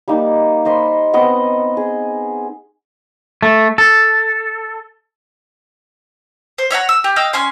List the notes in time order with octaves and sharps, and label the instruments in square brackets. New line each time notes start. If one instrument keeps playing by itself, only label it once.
[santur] G3 A#3 D#4
C5 D#5 B5 C6
B3 C4 D#5 F#5
G#4
[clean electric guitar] A3
A4
[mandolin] C5
C#5 E5 F#5 A#5
E6
G4
D#5 F5 G5 E6
C#4 G#5 C6